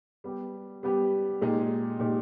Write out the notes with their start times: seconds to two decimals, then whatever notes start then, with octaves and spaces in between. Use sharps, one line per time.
0.24 G3 B3 G4
0.83 G3 B3 G4
1.42 A#2 G#3 D#4 G4
2.00 A#2 G#3 D#4 G4